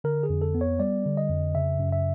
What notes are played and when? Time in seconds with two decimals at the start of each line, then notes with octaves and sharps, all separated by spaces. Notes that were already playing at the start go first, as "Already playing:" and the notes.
0.04 D3 A#4
0.23 G#4
0.30 F2
0.42 A4
0.55 B3
0.61 C#5
0.80 G3 D5
1.05 D3
1.17 D#5
1.30 F2
1.55 C#3 E5
1.80 F#2
1.92 E5